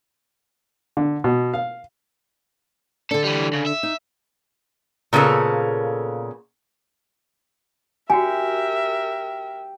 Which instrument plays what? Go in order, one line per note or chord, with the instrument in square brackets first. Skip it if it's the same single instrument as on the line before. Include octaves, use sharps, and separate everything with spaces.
[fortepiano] D3
B2
F5
[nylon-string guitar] D3 D4 [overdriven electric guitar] A4
[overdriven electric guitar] E3 G3
C#3
E5
[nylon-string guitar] D#4
[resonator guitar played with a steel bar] A#2 C#3 A#3 B3 A4
[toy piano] F#4 G5 G#5 [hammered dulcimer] G4 [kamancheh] A#4 E5